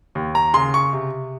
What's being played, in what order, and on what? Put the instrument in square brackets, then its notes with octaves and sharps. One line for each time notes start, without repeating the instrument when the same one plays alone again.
[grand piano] D#2
A#5
C#3 C6
C#6
C3